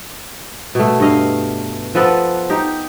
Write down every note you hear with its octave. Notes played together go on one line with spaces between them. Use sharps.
B2 A3
G2 D#5 F5
F3 B3 A4 B4
D#4 G4